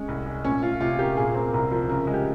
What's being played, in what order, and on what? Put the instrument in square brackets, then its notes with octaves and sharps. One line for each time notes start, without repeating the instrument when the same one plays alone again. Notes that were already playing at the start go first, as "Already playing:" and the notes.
Already playing: [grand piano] G#3 [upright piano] C#4
[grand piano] C2
G#3
[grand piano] A#2 [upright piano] C#4
[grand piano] C#4 [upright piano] F4
[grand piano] C3 [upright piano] F4
[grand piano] A#3 [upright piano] G4
[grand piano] A#2 [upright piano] G#4
[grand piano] C4 [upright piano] A#4
[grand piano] C2 [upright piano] A#4
[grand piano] F3 [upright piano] A#4
[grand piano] C#3 [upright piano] A#4
[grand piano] G#3
[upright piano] G4